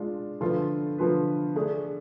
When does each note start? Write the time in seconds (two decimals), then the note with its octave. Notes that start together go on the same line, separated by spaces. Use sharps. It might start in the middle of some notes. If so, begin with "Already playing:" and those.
Already playing: G#3 D4 F4
0.41 D3 F3 A3 F4 B4
0.98 D3 F3 A3 F4 B4
1.56 A3 D4 G#4